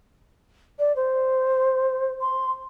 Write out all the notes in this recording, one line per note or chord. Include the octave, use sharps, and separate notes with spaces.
D5
C5
C6